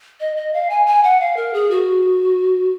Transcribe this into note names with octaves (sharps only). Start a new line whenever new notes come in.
D#5
D#5
F5
G#5
G#5
F#5
F5
A#4
G#4
F#4